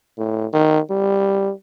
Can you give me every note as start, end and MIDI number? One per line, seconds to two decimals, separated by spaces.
0.18 0.46 45
0.53 0.79 51
0.90 1.51 55